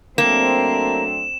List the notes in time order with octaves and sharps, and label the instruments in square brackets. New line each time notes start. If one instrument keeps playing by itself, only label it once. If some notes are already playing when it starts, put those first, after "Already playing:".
[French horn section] F#3 A3 D4 [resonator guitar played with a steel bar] A#3 [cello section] C4 [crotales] E7